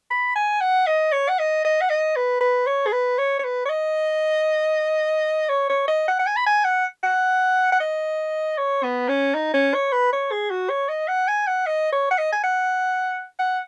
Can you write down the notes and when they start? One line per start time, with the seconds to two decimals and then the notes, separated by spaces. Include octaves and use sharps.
0.11 B5
0.36 G#5
0.61 F#5
0.87 D#5
1.12 C#5
1.29 F#5
1.39 D#5
1.64 D#5
1.81 F#5
1.90 D#5
2.16 B4
2.41 B4
2.67 C#5
2.87 G#4
2.92 B4
3.18 C#5
3.39 C#5
3.44 B4
3.65 C#5
3.69 D#5
5.49 C#5
5.69 C#5
5.88 D#5
6.08 F#5
6.19 F#5
6.27 G#5
6.36 B5
6.46 G#5
6.65 F#5
7.04 F#5
7.72 F#5
7.80 D#5
8.58 C#5
8.83 B3
9.09 C#4
9.35 D#4
9.54 C#4
9.74 C#5
9.92 B4
10.13 C#5
10.32 G#4
10.51 F#4
10.70 C#5
10.89 D#5
11.08 F#5
11.28 G#5
11.47 F#5
11.66 D#5
11.92 C#5
12.11 F#5
12.18 D#5
12.32 G#5
12.44 F#5
13.39 F#5